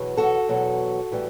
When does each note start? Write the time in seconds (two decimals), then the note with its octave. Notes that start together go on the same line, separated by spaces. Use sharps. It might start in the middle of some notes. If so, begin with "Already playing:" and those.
Already playing: E2 B2 F#3
0.17 F#4 A4
0.49 E2 B2 F#3
1.11 A2 E3 G3